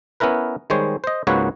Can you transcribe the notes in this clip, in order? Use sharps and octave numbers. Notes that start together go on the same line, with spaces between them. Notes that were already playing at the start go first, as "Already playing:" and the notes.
B3 C#4 E4 A#4 B4
D#3 G3 G#3 C5 C#5
C5 D#5
C#2 G#2 A#3 F#4 B4 C#5